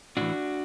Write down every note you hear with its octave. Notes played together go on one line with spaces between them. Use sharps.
A2 E3 D4 F#4